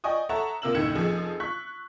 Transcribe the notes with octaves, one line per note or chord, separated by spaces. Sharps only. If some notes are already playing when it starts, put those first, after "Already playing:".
D5 D#5 G5 G#5 C#6 D#6
A4 C#5 E5 F#5 A5 A#5
C3 A#3 F4 E6 E7 F#7
F#1 D#2 A2 G#6 C#7 E7
F1 F3 G#4
C#6 F#6 B6